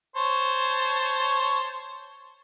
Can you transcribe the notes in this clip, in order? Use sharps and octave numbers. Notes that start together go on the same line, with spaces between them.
C5 C#5 A5